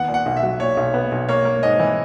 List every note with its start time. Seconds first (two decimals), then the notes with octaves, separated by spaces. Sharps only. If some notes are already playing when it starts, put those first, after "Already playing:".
Already playing: D#2 B3 F#5
0.08 A#2
0.14 F#5
0.26 B1
0.37 E5
0.43 F#3
0.60 A#2 C#5
0.77 B1
0.94 B3
1.12 B1
1.29 A#3 C#5
1.45 A#3
1.63 G#2 D#5
1.80 E3